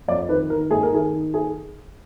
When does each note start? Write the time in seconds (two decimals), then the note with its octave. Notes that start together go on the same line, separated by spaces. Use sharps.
0.08 F2 D5
0.28 D#3 B4
0.50 D#3 A#4
0.71 G#2 G#4
0.83 A#4
0.93 D#3 G#4
1.13 D#3
1.34 G#4